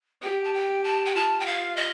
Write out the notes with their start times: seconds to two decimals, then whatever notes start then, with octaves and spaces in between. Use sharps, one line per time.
0.22 G4 G5
0.44 A5
0.54 G5
0.84 A5
1.05 G5
1.15 F4 A5
1.40 G5
1.46 F5
1.76 D#5